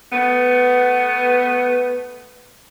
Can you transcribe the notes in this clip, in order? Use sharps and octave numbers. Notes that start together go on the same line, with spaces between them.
A3 B3